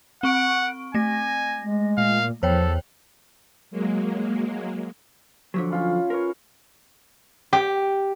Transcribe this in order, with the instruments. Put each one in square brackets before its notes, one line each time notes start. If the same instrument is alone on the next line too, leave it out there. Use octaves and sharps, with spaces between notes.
[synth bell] C4 C#6 D7 [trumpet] F#5
[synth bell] A3 A#6 [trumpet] G#5
[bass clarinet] G#3
[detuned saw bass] A#2 [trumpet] F5
[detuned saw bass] E2 [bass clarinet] F3 [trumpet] A4 [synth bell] C5 C#5 G5
[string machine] F#3 G#3 A#3
[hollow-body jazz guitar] D3 F3 F#3
[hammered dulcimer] C#4 F4 B5
[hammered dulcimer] F4 B4 C#5 [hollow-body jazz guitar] A#4
[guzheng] G4